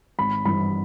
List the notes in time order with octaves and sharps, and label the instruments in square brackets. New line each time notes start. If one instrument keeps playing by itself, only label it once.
[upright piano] G#1 B5
G2 E3 B5